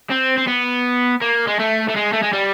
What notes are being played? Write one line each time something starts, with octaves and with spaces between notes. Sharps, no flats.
C4
C4
B3
A#3
G#3
A3
A3
G#3
A3
G#3
G3